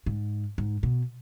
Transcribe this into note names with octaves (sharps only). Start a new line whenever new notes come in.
G#2
G#2
B2